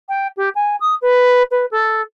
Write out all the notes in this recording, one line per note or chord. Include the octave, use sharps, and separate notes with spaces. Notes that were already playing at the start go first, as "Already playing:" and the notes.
G5
G4
G#5
D#6
B4
B4
A4